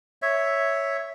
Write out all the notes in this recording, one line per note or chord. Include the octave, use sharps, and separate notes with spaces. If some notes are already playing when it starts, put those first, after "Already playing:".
C#5 E5